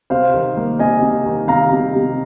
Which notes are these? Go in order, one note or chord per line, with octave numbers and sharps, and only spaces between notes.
C3 C5 F5
D#3
A#3
C3 D#5 G#5
C3
D#3
C3 F5 A#5
C3
C3